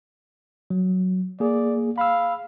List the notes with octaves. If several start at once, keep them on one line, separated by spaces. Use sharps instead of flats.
F#3
A#3 G#4 D5
F5 B5 E6